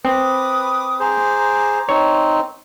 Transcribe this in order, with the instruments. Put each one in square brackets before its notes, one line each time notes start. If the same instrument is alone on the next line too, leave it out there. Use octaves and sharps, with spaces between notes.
[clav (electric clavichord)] C4 [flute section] B4 D6 D#6
[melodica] G#4 C5 [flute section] A#5 D6
[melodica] C4 D#4 [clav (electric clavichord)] C#5